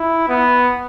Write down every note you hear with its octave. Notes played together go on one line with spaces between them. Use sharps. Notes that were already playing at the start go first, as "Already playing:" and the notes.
Already playing: E4
B3